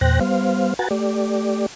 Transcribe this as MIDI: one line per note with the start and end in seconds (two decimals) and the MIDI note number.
0.01 0.20 40
0.01 0.20 46
0.01 0.20 72
0.01 0.20 79
0.01 0.20 90
0.01 0.20 94
0.21 0.74 55
0.21 0.74 59
0.21 0.74 72
0.21 0.74 77
0.79 0.88 66
0.79 0.88 71
0.79 0.88 78
0.79 0.88 80
0.79 0.88 82
0.79 0.88 93
0.91 1.66 57
0.91 1.66 67
0.91 1.66 74